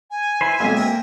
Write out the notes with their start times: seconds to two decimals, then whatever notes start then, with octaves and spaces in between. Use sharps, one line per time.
0.11 G#5
0.41 E4 B4 C5
0.60 B1 F2 G#3 A#3 E5
0.76 C4 A#4 G5